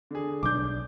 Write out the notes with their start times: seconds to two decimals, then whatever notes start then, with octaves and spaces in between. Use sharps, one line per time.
0.11 D3 G#4
0.43 B1 F#3 D4 D6 G6